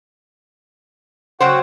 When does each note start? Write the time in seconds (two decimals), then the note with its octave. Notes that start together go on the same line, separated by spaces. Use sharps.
1.40 C#3 F#3 F#4 C5 F#5 G5